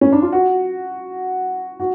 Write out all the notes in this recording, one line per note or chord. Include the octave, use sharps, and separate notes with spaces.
C#4
D4
F4
F#4
F#4